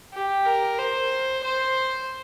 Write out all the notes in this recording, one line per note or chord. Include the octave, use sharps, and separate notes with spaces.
G4
A#4
C5
C5